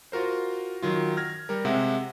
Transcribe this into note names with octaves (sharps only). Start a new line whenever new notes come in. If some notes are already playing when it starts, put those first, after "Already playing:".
F4 F#4 A#4 C5
D#3 F#3 F4
F6 G#6 A#6
G3 A#4
C3 G#3 E5 F#5